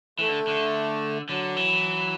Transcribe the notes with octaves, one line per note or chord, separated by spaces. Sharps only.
E3 A3
D3
D3
D3 F#3
E3